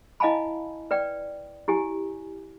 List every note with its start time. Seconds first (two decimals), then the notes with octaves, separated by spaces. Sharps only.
0.20 E4 D#5 F5 G#5 A5 B5
0.91 B4 D5 G5
1.68 E4 G4 G#5